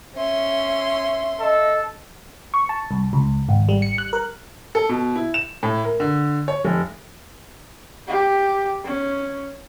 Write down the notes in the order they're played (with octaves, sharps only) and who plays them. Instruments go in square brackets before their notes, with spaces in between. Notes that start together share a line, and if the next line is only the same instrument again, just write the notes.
[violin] C#4 C6 [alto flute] E5
[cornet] A4 [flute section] D#5
[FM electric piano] C#6
A5
C2
C#2
G#1
G3
C#7
F#6
A#4
[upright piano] A4
B2
E4
E7
A2
A#4
D3
C#5
F1
[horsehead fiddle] G4
C#4